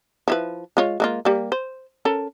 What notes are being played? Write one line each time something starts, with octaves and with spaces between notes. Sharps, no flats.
F3 E4 B4
G#3 F4 C#5
G#3 A#3 F4
G3 A#3
C5
C#4 A4 A#4